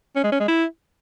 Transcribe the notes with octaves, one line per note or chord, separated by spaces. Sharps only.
C#4
G#3
C#4
G#3
E4